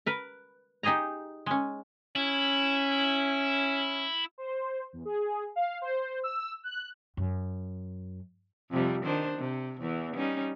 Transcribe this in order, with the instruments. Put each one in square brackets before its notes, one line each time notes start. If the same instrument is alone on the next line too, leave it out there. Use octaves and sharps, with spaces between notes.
[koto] A#4 B4
D#4 G4 G#4 D#5 A#5
G#3 C#4
[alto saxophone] C#4 [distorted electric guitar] E4
[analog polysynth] C5
E2
G#4
F5
C5
E6
F#6
[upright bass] F#2
[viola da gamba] F2 C3 G3
D#3 D4 C5
C3
E2 E3
G3 C#4 D#4